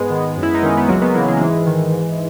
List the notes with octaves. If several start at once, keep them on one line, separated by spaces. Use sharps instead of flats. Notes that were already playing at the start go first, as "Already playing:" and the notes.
Already playing: G#2 G#3 B3
D#3
F#2
E4
D#4
D#3 C#4
B3
C#2 F#3 A#3
G#3 B3
C#3 E3 F#3 A#3
E3 G#3
A#3
G#2 E3 G#3
D#3
G#2